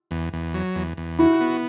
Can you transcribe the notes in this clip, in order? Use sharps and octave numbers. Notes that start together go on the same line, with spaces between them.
E2
E2
F#3
E2
E2
E4 F#4
B3